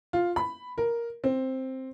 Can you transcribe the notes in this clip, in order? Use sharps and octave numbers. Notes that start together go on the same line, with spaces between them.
F4
B5
A#4
C4